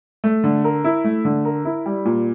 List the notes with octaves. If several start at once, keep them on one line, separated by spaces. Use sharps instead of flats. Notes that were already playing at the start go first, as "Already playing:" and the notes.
A3
D3
A#4
E4
A3
D3
A#4
E4
G3
A#2